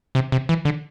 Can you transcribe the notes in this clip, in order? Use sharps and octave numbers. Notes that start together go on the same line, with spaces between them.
C3
C3
E3
D3